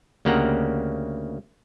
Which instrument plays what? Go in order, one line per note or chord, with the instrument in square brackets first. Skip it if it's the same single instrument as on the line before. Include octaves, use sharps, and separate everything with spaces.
[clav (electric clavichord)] D2 C#3 A#3 G4 F#5 A#5